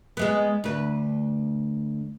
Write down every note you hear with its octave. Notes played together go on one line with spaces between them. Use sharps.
G#3 A3 B3
D2 B4